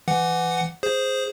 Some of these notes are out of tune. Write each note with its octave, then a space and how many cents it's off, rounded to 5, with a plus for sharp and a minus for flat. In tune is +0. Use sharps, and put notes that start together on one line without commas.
E3 +25 F#5 +0
G#4 +0 C5 +0